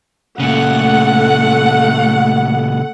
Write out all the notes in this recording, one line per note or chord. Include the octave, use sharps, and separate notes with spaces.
A#2 C#3 A3 F#5